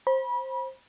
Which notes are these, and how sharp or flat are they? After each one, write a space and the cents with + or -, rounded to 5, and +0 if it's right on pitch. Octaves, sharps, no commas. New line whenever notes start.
C5 +15 B5 -30